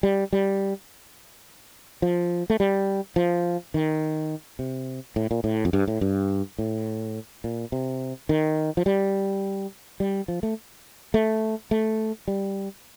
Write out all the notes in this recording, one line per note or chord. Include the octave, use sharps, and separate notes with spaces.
G3
G3
F3
A3
G3
F3
D#3
C3
A2
A#2
A2
F2
G2
A2
G2
A2
A#2
C3
D#3
F3
G3
G3
F3
A3
A3
A3
G3